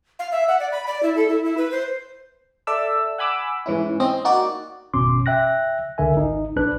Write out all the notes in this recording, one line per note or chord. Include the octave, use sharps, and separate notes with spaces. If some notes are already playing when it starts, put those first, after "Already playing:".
F5
E5
F#5
D5
B5
D5
E4
A4
E4
E4
B4
C5
A4 D5 E5 A5 E6
F#5 G#5 B5 D6 E6
G#2 E3 C#4 E4
C4 C#4 D#5
A#3 D#4 F#4 D5
G#1 F#2 B2 C#4 C6 D6
E5 G5 F#6 A#6
C#2 D3 A#4 E5 G#5
G#1 D#4
A#1 D4 B4 F#6